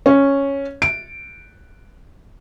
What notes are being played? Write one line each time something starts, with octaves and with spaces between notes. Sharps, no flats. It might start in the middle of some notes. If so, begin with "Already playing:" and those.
C#4
D7